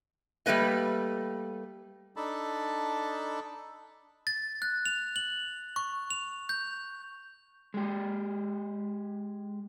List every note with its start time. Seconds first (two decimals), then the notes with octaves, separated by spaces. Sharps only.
0.46 G3 A3 A#3 B4 D#5
2.16 D4 D#4 A4 A5 B5
4.27 A6
4.62 F#6
4.86 F7
5.16 F#7
5.76 C#6
6.10 F7
6.49 G6
7.74 G#3 G4